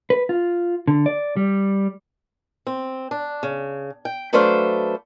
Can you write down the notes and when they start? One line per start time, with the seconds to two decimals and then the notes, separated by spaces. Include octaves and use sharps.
0.10 B4
0.29 F4
0.88 D3
1.06 D5
1.37 G3
2.67 C4
3.11 D4
3.43 C#3
4.05 G5
4.33 F#3 A3 D4 B4 C5 F5